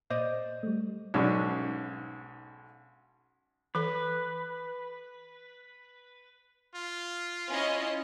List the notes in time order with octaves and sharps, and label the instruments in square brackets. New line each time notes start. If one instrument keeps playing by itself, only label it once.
[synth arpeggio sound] A#2 [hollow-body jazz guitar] C5 D5 D#5
[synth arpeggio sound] G3 A3
[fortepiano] B1 G#2 C#4 D4
[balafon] E3 A4 [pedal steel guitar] B4
[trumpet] F4
[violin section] C#4 E4 D#5